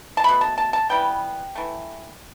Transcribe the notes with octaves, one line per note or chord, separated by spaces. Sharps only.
A5
B2 A3 B5
A5
A5
A5
E3 G3 B3 G5
E3 A3